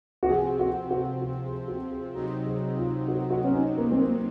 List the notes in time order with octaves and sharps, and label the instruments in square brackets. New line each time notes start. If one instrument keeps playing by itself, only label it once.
[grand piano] F#4
[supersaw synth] C3 F3 C4 [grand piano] G#4
[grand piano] F#4
F#4
F#4
G#4
F#4
G#4
[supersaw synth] C3 F#3 C4 D#4 [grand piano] F#4
[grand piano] G#4
F4
F#4
F#4
C#4
D#4
A#3
C4
A#3